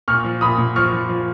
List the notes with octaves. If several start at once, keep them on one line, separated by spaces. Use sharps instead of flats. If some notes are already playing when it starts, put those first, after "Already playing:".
A#2 C#6 F6
F3
A#2 B5 D#6
A#2
F3 C#6 F6
F3
F3